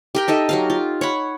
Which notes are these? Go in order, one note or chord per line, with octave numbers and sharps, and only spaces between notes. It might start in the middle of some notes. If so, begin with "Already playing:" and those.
G4 A#4 G5
D#4 A4 D#5 E5
F#3 G4 F5
F4
C#5 F#5 B5